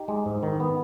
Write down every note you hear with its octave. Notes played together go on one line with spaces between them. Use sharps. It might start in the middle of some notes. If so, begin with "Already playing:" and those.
Already playing: D#4 G4
G#3
G#2
D#3
B3